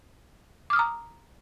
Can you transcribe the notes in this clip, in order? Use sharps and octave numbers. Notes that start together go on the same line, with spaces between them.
A#5 D6 D#6 F6